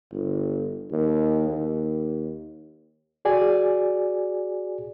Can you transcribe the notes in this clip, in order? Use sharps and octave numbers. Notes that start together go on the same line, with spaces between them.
G1
D#2
D#2
F#4 G#4 D5 G#5